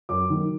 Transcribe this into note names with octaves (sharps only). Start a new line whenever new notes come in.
F#2 D6
D#3 F#3